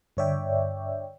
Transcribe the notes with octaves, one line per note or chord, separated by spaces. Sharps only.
G2 D3 C#5 D5 E5 G5